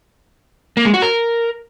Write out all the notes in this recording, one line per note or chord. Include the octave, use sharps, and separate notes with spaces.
A#3
G#3
F#4
A#4